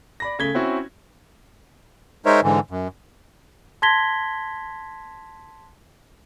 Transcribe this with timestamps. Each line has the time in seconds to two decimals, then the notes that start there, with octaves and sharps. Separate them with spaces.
0.20 D5 B5 A#6
0.39 C#3 A3 G#6 B6 G7
0.55 C4 C#4 E4 F#4
2.26 G#3 D#4 A#4 C5 C#5 E5
2.43 G#2 D3 E3
2.70 F#2
3.82 A5 C6 G#6 A#6 B6 G7